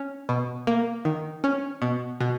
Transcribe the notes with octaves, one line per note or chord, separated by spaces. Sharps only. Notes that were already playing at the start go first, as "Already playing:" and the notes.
Already playing: C#4
B2
A#3
D#3
C#4
B2
B2